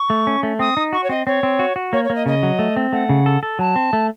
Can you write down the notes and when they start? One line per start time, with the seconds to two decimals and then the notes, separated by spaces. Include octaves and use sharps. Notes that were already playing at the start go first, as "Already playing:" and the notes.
Already playing: C#6
0.10 A3
0.27 C#4
0.43 A3
0.59 C4 D#6
0.77 D#4
0.93 F#4 C#6
1.03 C#5
1.09 C4 D#5
1.26 C4 C#5
1.43 C4
1.59 F#4
1.76 F#4
1.93 A#3 C#5
2.04 C#5
2.10 A#3
2.15 D#5
2.26 C#3 D#5
2.43 F#3
2.59 A3
2.76 C4
2.92 A3 F#5
3.09 C#3
3.26 A4
3.43 A4
3.59 F#3 A5
3.76 C4
3.93 A3